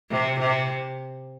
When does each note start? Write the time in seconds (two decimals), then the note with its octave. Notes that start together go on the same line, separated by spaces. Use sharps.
0.10 C3
0.39 C3